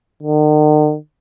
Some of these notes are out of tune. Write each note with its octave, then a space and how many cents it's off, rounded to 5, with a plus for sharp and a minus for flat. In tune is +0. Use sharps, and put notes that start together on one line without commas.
D#3 -45